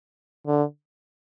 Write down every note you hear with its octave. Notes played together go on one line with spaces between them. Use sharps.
D3